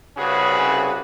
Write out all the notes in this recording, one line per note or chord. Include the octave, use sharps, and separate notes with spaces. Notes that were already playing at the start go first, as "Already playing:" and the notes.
C2 C#3 C#4 F#4 G#4 B4